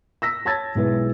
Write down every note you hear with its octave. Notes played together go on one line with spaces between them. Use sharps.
E6 A#6 B6
C#5 A5 E6 G#6 A6
B1 G#3 E4 B4